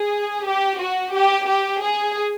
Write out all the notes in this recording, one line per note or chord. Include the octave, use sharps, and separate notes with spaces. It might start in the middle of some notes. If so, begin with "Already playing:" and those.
Already playing: G#4
G4
F#4
G4
G4
G#4